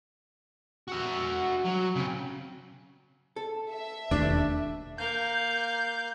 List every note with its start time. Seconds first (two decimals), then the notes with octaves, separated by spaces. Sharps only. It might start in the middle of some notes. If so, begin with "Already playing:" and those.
0.88 F#4 E5
1.65 F#3
1.96 C#3 C4
3.36 A4
3.70 E5
4.11 E1 D#2 A3 D4
4.98 A#3 F5 G6